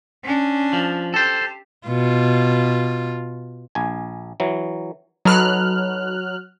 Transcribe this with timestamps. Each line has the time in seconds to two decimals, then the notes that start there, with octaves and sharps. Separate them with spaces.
0.23 C#4 D4
0.73 F3
1.14 G4 A4 C5
1.88 B2 F4
3.75 A#1 G#5
4.40 E3 F#3
5.25 F#3 D#4 A4 B4 F6 F#6